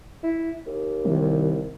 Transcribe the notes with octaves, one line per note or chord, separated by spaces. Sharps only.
E4
D#2
C2 D#3